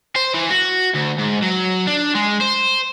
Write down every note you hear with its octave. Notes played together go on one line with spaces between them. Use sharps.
C5
E3
F#4
D2
G#2
F#3
D4
G#3
C5